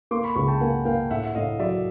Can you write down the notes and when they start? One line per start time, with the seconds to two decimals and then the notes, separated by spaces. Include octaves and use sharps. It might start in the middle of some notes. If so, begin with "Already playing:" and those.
0.11 A#3 C6 D6
0.24 B5 C#6
0.35 C#2 B5 C#6
0.48 G5 A5
0.60 A#3 F#5 G#5
0.85 A#3 F5 G5
1.10 A2 E5 F#5
1.25 E5
1.35 A2 D#5 F5
1.59 F#3 D5 E5